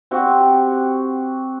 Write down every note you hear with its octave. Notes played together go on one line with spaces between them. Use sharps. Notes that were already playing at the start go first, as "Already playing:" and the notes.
C4 F#4 G4